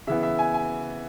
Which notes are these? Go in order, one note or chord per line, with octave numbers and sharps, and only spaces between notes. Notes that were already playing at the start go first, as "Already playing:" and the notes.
C#3 E3 B3 E5
E5
G#5
G#5